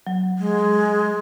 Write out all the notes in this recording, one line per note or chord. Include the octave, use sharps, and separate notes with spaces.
F#3
G#3